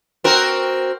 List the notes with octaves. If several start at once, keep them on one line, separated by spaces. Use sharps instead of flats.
C4 F#4 A#4